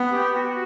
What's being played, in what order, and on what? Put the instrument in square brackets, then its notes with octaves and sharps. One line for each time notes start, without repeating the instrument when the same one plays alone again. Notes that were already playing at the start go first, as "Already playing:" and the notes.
Already playing: [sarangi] B3
[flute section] G4
F#4